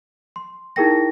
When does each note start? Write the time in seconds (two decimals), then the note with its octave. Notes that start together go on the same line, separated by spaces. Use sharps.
0.36 C6
0.76 D#4 E4 G#4 A#4 G5 A#6